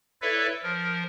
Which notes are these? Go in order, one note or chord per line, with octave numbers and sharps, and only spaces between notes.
E4 A4 B4 C#5 D5 E5
F3 A#4